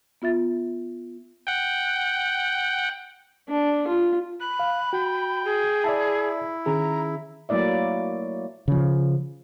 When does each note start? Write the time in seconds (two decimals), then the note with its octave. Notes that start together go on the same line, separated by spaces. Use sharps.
0.22 B3 F4 E5 A6
1.47 F#5 G5
3.49 D4
3.87 F4
4.41 B5 F#6
4.59 F5
4.93 F#4 G5
5.45 G#4
5.84 E4 D5 E5 A5
6.66 D#3 C#4 G#4 A#5
7.49 F#3 A3 A#3 E4 D5 E5
8.68 C#3 F3